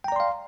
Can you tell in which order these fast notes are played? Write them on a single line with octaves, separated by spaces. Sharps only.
G5 A#5 D5 C6 F5